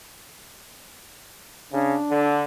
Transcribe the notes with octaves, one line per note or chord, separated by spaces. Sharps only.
C#3 D4
D3